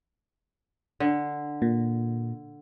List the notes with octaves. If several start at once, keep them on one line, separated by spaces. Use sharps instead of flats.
D3
A#2